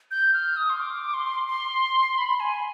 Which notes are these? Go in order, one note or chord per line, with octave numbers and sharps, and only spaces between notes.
G6
F6
D#6
C6
D6
C6
C6
B5
G#5